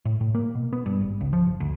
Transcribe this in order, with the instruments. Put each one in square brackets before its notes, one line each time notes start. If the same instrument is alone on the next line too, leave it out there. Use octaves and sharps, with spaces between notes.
[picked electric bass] A2
A2
A#3
B2
B3
G2
G#1
C#2
F3
G1
D2